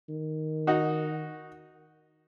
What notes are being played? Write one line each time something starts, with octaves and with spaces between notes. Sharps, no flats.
D#3
D#4 F#4